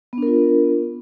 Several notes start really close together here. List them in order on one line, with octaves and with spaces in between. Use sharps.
B3 D4 A#4 F4